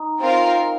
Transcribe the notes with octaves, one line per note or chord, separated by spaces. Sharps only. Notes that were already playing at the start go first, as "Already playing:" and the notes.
Already playing: D#4
C4 F4 A#4 F5